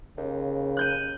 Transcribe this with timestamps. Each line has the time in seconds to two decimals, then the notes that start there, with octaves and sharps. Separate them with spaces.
0.18 D#2 C#3
0.77 F#6 G6 D#7